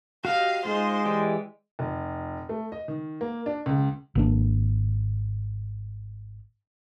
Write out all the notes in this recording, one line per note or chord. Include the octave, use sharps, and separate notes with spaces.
F#4 G4 D#5 F5
G#3 D#4 F4 C5
E3 G4 D5
F1
A3
D#5
D#3
A#3
D4
C#2
G#1 A#3 D4